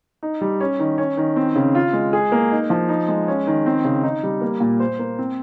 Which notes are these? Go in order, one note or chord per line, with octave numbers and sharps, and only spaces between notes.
D#4
G3
C#4
D#3
C#4
D#3
C4
C#3
F4
G#3
G#4
A#3
D#4
F3
D#4
G#3
C#4
D#3
C4
C#3
D#4
G3
A#3
A#2
C5
A#3
C4